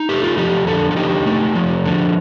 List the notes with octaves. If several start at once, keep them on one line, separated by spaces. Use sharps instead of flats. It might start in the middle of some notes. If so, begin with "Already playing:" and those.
Already playing: D#4
A3 G4
F4
F3 G4
D3 A4
A4
D#4 G4
A3
F3
D3